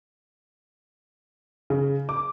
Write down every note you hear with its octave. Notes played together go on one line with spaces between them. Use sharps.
C#3
D6